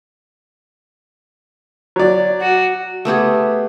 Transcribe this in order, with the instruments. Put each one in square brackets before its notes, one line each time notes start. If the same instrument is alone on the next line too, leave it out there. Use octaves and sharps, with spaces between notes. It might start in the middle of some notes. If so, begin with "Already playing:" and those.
[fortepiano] F#3 D5
[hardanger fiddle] F#4
[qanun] A3 B3 G4 G#4